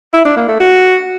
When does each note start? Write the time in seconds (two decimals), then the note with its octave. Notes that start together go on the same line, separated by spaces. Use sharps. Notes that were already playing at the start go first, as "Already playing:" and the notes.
0.14 E4
0.25 D4
0.37 A#3
0.48 A3
0.60 F#4